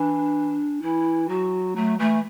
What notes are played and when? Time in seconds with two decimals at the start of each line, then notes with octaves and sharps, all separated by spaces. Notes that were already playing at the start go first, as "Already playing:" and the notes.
Already playing: E3 D4
0.82 E3 E4
1.29 F#3 F#4
1.76 F#3 A3
1.99 E3 A3